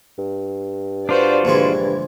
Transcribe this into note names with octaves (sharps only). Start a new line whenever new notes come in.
G2
D4 F4 F#4 B4 C5 D5
A#1 G2 D3 E3 G#3